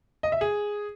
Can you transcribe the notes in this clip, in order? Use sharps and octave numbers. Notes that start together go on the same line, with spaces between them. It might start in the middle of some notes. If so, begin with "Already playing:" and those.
D#5
E5
G#4